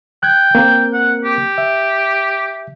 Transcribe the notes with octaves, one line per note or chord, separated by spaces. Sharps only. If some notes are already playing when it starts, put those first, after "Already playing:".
G5 F#6 G#6
A#3 C4 A#4
F#5
G4
E5